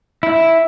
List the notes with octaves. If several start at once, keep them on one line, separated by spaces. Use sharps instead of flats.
E4